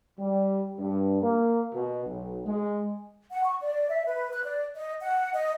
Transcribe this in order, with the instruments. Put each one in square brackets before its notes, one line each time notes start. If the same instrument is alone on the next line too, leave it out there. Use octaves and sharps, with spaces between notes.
[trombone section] G3
G2
A#3
B2
B1
G#3
[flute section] F#5
C#6
D5
E5
B4
F#6
D5
D#5
F#5
D#5